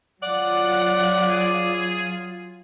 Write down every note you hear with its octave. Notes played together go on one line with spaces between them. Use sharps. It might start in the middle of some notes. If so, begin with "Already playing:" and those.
F#3 F4 D5 F#5
G#4